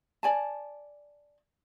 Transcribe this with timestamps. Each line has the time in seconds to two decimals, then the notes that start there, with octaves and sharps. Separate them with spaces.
0.23 D5 G#5 A5